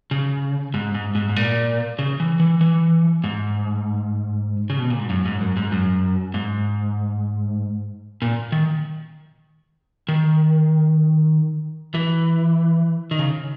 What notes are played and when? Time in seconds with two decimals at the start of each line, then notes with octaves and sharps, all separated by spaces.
0.11 C#3
0.74 G#2
0.95 G#2
1.15 G#2
1.29 G#2
1.36 A#2
1.99 C#3
2.20 E3
2.40 E3
2.61 E3
3.24 G#2
4.70 C#3
4.79 B2
4.90 A#2
4.99 G#2
5.10 F#2
5.25 G#2
5.41 F#2
5.57 G#2
5.72 F#2
6.34 G#2
8.22 A#2
8.52 D#3
10.08 D#3
11.94 E3
13.11 D#3
13.19 C#3